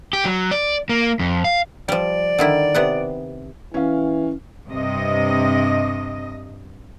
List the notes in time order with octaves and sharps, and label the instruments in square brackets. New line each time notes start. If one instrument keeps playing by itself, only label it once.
[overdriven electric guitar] G4
F#3
D5
A#3
F2
F5
[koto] F3 G3 [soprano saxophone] D5
[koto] D3 D#3 E4
C3 B3 F#5
[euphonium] E3 [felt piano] C#4 F5
[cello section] G2 C3 D#5